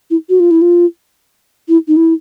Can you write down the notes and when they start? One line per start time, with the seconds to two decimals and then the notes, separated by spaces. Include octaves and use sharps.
0.11 E4
0.29 F#4
0.40 F4
0.51 E4
0.62 F4
1.69 E4
1.88 D#4
1.97 E4